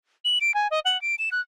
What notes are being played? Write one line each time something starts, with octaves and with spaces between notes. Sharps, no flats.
F#7
D7
G#5
D#5
F#5
D7
E7
F#6